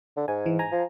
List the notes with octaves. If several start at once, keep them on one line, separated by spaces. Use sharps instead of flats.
D3
G#2 G#5
E3
G#5 A#5
F3